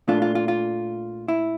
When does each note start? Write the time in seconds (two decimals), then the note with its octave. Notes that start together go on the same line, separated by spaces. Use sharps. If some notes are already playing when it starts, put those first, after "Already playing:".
0.08 A#2 A3 D4 F4
0.22 F4
0.35 F4
0.48 F4
1.28 E4